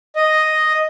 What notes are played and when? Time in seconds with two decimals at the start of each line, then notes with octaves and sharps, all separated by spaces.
0.16 D#5